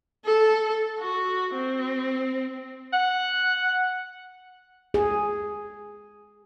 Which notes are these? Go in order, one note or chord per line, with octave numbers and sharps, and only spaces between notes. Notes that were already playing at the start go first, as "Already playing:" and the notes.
A4
F#4
C4
F#5
G#4